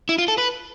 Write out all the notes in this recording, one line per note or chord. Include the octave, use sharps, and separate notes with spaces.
E4
F4
A4
B4